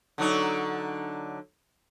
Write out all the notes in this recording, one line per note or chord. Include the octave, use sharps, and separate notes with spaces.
D3 F#3 D#4